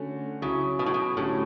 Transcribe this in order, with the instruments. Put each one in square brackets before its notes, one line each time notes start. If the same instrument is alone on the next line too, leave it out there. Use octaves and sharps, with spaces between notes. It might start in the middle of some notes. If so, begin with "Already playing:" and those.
Already playing: [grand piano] D3 A3 C#4 F#4
[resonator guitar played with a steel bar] C#3 [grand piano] F#3 C#4 E4
[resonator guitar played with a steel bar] B2
A2
B2
[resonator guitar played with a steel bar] A2 [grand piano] D3 F#3 A3 C#4 G4